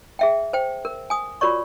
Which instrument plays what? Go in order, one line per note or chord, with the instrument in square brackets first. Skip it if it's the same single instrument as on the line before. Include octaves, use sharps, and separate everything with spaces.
[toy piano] G#4 E5 G5
C5 G5
A#4
G#5 D#6
F4 F#4 A#4 C#5 D5 C#6